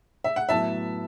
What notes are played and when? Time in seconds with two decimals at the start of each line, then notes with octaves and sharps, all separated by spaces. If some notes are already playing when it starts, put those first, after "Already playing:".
0.24 E5
0.36 F#5
0.49 A2 F#3 B3 E4 E5 A5